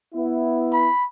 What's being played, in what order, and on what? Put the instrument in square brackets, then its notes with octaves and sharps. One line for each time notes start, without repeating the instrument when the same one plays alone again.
[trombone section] B3 E4
[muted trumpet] B5